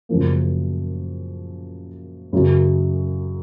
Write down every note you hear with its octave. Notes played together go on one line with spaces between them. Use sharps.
F#2 C#3 F3 A#3
F#2 C#3 F#3